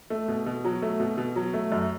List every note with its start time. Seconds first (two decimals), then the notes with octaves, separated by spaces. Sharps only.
0.10 A3
0.28 B2
0.46 B2
0.65 F#3
0.82 A3
1.00 B2
1.18 B2
1.36 F#3
1.54 A3
1.72 F#2